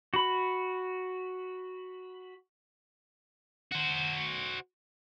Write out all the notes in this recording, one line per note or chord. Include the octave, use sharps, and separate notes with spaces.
F#4 B5
F#4 C5